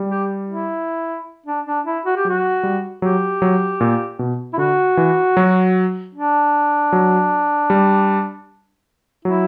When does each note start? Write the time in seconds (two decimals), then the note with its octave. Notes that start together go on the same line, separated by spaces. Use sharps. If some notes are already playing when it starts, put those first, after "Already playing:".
Already playing: G3
0.10 G4
0.50 E4
1.46 D4
1.66 D4
1.86 E4
2.06 F#4
2.17 G4
2.25 F#3 F#4
2.63 G3
3.02 F#3 G4
3.42 F#3
3.81 A#2
4.19 B2
4.53 E4
4.58 D3 F#4
4.97 E3
5.37 F#3
6.15 D4
6.92 F#3
7.70 G3
9.25 F#3 E4